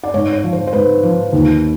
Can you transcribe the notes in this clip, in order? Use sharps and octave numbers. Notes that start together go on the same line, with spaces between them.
D5
G#2 C#5
C#5
F3
C5
C5
G#2 B4
F3
D#2